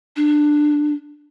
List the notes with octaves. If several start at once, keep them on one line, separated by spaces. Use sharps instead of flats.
D4